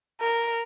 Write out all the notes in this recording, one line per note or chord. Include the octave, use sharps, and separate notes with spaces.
A#4